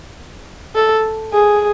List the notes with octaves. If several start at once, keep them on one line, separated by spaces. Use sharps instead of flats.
A4
G#4